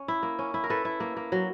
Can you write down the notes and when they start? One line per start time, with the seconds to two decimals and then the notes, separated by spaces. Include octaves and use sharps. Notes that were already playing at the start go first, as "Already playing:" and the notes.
Already playing: C#4
0.08 E4
0.23 A#3
0.39 C#4
0.54 E4
0.64 A#4
0.69 E4 A4 B4
0.85 E4
1.00 A#3
1.17 A#3
1.32 F#3